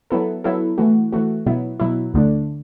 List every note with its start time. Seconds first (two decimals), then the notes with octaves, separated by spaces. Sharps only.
0.10 F#3 B3 E4 A4
0.44 F#3 B3 E4 A4
0.78 E3 A3 F#4
1.12 E3 A3 F#4
1.46 B2 F#3 B3 E4
1.80 B2 F#3 B3 E4
2.14 D2 D3 A3 D4